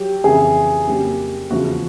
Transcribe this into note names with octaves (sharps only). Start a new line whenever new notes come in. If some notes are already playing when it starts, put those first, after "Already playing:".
Already playing: F#3 G4
F2 C#3 E3 G#4
F2 C#3 F#3 A#3 G4
E2 C#3 F3 F#4